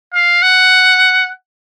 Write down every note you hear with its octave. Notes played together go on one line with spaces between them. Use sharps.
F5
F#5